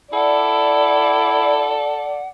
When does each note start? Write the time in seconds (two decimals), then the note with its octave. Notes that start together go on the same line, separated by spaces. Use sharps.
0.13 E4 A4 D5 F#5